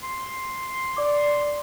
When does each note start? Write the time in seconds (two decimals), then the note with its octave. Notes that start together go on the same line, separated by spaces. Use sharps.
0.02 C6
0.97 D5 D6